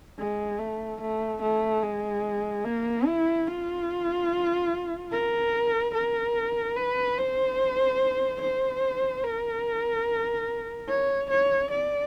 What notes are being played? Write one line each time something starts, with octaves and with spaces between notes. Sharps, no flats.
G#3
A3
A3
A3
G#3
A#3
E4
F4
A#4
A#4
B4
C5
C5
A#4
C#5
C#5
D5